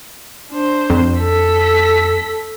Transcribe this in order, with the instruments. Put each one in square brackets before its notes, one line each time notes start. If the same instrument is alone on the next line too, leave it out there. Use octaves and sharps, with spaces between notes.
[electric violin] D4 C5
[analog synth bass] F2
[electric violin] A4 B6